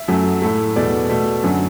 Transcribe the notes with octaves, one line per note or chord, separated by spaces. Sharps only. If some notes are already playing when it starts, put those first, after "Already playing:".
Already playing: E5
F#2 F#3 A3
A2 A3
E2 B2 A3 D5
B2 A3
F#2 D3 F#3